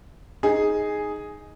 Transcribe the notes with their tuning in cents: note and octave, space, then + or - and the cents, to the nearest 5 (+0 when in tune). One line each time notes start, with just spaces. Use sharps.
D#4 +0 G#4 +0